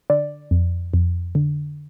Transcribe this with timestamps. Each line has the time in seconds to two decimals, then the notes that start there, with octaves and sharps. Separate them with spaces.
0.10 D3 D5
0.51 F2
0.94 F2
1.35 D3